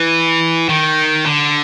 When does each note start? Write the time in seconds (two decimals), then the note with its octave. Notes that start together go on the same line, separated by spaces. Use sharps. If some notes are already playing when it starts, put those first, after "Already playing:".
Already playing: E3
0.69 D#3
1.26 D3